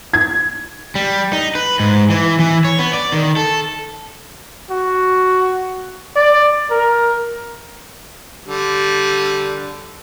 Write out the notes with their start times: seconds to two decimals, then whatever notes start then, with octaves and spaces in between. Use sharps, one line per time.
0.13 G#6
0.95 G3
1.33 D#4
1.55 B4
1.80 G#2
2.10 E3
2.40 E3
2.65 C#5
2.79 B3
2.93 D5
3.12 D#3
3.37 A4
4.70 F#4
6.16 D5
6.71 A#4
8.45 D3 G3